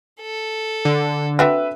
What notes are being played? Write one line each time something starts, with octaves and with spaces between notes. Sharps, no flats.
A4
D3
C4 D4 F#4 B4 E5